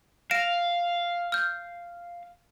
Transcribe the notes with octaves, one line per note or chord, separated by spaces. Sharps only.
F5 A#6 D7 E7
F6 G6